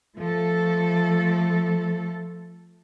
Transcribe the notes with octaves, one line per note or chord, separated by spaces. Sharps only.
F3 A3 A4